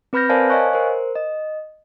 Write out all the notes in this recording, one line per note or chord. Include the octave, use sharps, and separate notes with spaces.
C4 B4 B5 F6 G6 A#6
A#4 C5 D5 F5 G#5 A5
C#5 D#5 F5 G#5 C#6 F#6
A#4 C5
D#5